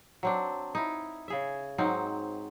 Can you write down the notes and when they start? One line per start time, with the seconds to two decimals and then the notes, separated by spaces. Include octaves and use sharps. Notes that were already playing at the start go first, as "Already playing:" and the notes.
0.23 F#3 C4 D4
0.75 D#4 E4
1.28 C#3 G#4 E5
1.78 G#2 F#3 C4 D#4